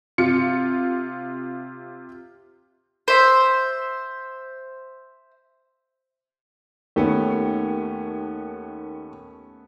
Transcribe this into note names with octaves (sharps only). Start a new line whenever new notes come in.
C3 F4 C#7
C5 E5
D#2 A3 B3 C#4